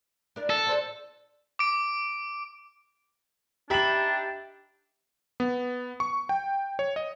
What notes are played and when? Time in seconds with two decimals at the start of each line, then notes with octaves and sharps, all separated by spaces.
0.36 D4 E4 A#4
0.50 A4
0.65 D4 F4 C5
1.59 D6 D7
3.70 D4 D#4 G4 E5 B5 F#7
5.40 B3
6.00 C#6
6.29 G5
6.79 C#5
6.96 D#5